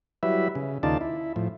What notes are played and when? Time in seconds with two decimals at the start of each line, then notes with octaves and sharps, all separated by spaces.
0.23 F#3 G3 E4 B4 E5
0.55 C#3
0.83 D#2 C#3 D#4 F4 D5 A5
1.01 E4
1.36 A2 F3